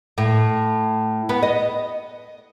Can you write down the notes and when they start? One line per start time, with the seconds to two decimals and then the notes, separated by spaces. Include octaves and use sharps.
0.18 A2
1.29 B3
1.43 D#5